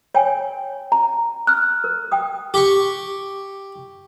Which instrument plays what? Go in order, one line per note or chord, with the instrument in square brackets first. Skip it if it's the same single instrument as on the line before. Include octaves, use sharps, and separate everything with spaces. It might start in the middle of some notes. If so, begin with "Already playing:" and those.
[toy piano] C#5 G5 G#5
[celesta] A#5
F6 F#6
[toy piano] A#4
G5 D#6
[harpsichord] G4 C#6